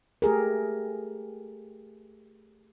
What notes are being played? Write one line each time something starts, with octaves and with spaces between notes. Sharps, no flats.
A3 G4 G#4 A#4